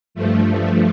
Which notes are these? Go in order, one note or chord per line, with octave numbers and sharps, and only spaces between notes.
G2 F3 A3